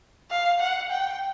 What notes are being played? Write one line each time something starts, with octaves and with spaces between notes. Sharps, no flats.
F5
F#5
G5